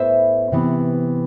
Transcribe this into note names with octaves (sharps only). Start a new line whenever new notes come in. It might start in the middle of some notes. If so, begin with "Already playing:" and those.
Already playing: A2 B3 C5 E5
C3 E3 B3